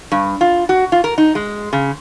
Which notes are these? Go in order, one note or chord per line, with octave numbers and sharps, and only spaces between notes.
G2
F4
F#4
F4
A#4
D#4
G#3
C#3